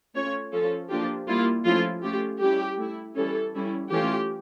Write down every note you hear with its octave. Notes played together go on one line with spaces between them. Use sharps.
A3 C#4 F4 C#5
F3 C#4 F4 A4
F3 A#3 D4 F4 G4
G3 A#3 E4 F4
F3 A3 C#4 E4 F4
A3 C#4 F4 G4
G3 C#4 E4 G4
A3 E4
E3 G3 C#4 E4 A4
G3 C#4 E4
E3 A3 C#4 F4 G4